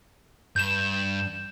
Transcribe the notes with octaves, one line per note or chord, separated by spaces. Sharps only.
G2 G6 E7